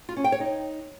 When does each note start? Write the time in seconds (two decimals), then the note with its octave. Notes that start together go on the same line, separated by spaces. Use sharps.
0.09 F4
0.17 C#4
0.24 G5
0.32 C#5
0.40 D#4